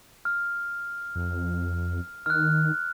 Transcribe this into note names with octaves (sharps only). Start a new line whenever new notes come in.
F6
F2
D#3 F6 F#6